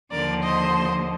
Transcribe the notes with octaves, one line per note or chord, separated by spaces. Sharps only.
D#2 D3 F3 A#4 D5
C5 D#5